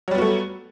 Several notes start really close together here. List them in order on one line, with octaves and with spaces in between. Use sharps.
F#3 G3 B3 F#4 A3